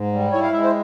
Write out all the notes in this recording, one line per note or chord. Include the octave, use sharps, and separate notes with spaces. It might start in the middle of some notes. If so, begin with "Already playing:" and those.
Already playing: G#2
G3
E4 C#5
F5
G#3 E5
C5